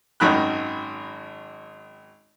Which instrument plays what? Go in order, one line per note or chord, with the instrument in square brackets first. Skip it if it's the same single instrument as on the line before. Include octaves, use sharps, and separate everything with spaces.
[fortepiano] G#1 F#2 D#3 B5 F#6